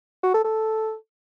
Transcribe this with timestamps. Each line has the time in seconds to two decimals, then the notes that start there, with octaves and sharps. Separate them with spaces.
0.24 F#4
0.34 A4
0.45 A4